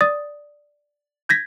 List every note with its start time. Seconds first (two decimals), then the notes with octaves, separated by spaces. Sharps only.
0.01 D5 D#6 A6
1.29 G6 G#6 A#6 B6